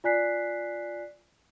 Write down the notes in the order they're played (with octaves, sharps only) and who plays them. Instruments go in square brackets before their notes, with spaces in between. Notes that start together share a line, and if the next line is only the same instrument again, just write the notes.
[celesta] F4 D5 G#5 F#6 B6 C7